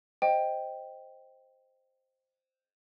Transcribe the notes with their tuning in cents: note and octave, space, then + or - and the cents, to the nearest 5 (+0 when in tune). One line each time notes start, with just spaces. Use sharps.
C5 +0 D#5 +0 G5 +0